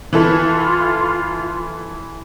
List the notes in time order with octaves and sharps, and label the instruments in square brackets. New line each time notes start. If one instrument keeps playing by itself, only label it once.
[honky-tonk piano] E3 E4 A4 [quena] F4